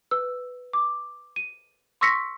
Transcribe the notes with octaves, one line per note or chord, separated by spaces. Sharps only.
B4 E6
D6
D#7
C6 C#6 E6 A#6 B6 C#7